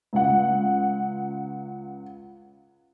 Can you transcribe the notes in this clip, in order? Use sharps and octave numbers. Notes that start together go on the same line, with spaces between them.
C#2 F#5